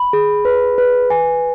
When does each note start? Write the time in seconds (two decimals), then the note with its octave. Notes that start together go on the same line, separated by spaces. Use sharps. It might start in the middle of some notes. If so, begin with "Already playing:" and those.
Already playing: B5
0.13 G#4
0.45 B4
0.78 B4
1.10 G#5